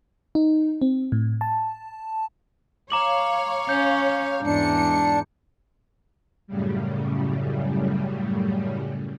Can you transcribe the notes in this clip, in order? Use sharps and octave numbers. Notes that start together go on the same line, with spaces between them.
D#4
C4
A2
A5
C#5 F5 A#5 D6 F#7
C#4 G6
E2 G#2 D4 C#7
F#2 A2 C#3 G3